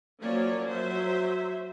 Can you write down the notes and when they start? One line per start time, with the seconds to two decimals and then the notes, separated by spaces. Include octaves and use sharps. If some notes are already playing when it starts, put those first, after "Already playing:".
0.21 F3 F#3 A#3 C#4 C#5 D5
0.67 F#3 C5 E5